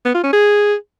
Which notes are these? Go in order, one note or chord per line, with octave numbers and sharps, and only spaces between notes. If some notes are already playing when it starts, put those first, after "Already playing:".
B3
F4
C#4
G#4